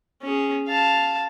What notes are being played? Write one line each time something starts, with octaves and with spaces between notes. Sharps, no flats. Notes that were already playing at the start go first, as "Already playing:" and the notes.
C#4 G#4
F5 A5